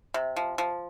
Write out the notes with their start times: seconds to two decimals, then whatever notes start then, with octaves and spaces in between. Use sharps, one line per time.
0.14 C3
0.36 F3
0.58 F3